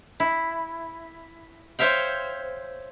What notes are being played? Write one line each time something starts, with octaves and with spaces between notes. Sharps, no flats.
E4
C5 C#5 E5 F5 G5